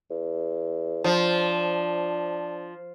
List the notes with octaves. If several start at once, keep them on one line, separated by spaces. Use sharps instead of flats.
E2
F3 D4